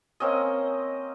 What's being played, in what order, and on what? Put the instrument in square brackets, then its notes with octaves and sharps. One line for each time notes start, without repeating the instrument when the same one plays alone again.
[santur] A#3 C4 C#4 D#5